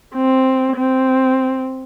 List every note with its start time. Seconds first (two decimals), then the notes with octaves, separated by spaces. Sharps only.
0.14 C4
0.76 C4